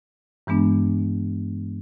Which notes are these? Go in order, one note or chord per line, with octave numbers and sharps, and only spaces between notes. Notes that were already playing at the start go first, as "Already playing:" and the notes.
G2 E3 G#3 B3 D4